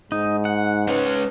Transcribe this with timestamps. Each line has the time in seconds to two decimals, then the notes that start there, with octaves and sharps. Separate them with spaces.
0.12 G#2 D#4
0.45 F#5
0.88 G#3 C#4 B4